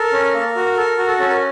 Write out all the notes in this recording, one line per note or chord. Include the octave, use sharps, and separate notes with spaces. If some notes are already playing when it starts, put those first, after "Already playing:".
Already playing: A4 A#4
C#4
A#3
F#4
A4
F#4
A4
C#4 A4
A#4